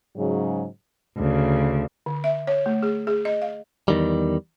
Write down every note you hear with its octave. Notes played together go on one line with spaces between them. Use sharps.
G#2 C#3 F#3
D2 C#3
D3
E5
C#5
A3
G#4
G#4
D#5
F5
E2 D#3 G3